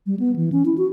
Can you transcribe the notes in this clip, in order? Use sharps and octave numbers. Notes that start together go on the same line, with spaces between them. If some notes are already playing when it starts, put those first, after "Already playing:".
G3
B3
E3
C#4
E4
F#4